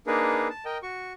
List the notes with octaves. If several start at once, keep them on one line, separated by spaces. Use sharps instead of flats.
A#3 D4 D#4 G#4 A#4 B4
A5
A#4 D#5 G5
F#4 C#6